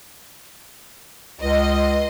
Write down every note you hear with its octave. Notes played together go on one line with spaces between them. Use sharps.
C#2 D#5 C6